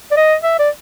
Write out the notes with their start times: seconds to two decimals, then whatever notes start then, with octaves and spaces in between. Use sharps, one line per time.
0.11 D5
0.17 D#5
0.43 E5
0.59 D5